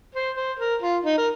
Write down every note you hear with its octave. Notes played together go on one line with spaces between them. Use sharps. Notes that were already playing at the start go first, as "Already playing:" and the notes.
C5
C5
A#4
F4
D#4
A#4